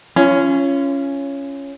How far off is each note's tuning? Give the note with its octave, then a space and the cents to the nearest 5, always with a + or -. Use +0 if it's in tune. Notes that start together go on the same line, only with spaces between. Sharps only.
C#4 +0 F4 -35